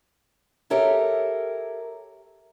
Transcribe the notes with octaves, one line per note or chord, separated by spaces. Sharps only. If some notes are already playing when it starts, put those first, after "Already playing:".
G4 A4 A#4 C#5 E5